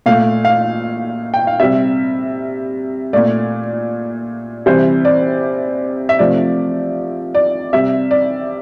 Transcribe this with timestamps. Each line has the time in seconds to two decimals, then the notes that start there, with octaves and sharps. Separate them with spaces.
0.06 A#2 A3 F5
0.45 F5
1.34 G5
1.47 F5
1.59 C3 G3 E5
3.13 A#2 A3 D5
4.66 C3 E3 G3 C5
5.05 D5
6.09 E5
6.19 C3 F3 A3 D5
7.35 D5
7.73 C3 G3 E5
8.11 D5